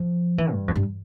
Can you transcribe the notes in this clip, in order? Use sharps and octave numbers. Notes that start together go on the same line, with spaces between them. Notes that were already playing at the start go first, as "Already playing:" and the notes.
Already playing: F3
E3
G2
F2
G2